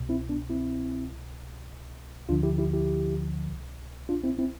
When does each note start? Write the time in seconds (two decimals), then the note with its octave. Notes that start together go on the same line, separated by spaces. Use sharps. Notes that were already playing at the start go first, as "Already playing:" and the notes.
Already playing: C2 B2
0.09 C4 E4
0.29 B3 D4
0.50 C4 E4
1.09 C2 B2
2.29 D2 D3 F3 D4 F4
2.43 E4 G4
2.58 E4 G4
2.73 E4 G4
3.48 C2 B2
4.09 D4 F4
4.24 C4 E4
4.38 C4 E4